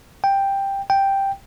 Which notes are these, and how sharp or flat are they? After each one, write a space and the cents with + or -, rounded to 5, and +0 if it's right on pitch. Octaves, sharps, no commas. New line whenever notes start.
G5 +5
G5 +0